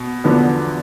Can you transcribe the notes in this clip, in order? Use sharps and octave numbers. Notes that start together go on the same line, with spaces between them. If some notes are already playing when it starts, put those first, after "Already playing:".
Already playing: B2
E2 D3 F3 B3